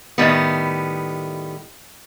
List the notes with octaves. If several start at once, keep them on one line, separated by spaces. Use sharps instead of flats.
A2 D#3 G3 B3